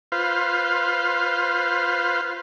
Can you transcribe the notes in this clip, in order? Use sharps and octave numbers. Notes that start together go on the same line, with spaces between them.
F4 B4 C5 F5